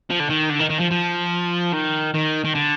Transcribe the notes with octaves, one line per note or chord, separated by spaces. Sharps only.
F3
D3
D#3
D3
D#3
D#3
F3
F3
D#3
D#3
D#3
D3